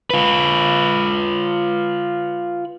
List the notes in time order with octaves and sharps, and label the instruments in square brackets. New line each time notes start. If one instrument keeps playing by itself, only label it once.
[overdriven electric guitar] F4 B4